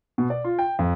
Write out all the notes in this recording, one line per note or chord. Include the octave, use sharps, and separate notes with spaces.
B2
D5
F4
G5
F2